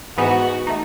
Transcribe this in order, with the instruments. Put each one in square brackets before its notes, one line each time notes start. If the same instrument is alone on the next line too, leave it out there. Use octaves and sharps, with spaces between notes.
[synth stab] G#2 E3 B3 D#4 [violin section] F#4
[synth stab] A3 D#4